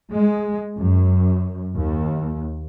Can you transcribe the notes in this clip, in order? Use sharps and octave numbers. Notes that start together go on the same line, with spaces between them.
G#3
F#2
D#2